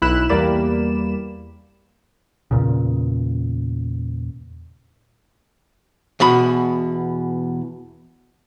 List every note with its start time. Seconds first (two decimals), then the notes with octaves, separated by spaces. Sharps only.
0.02 B1 E4 B5 F#6 E7
0.29 E2 G3 A#3 D5 B5 E7
2.51 E2 A#2 C#3
6.20 E2 B2 B5